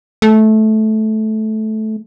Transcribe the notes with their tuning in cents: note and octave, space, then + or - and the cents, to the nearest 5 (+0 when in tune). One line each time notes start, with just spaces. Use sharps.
A3 -15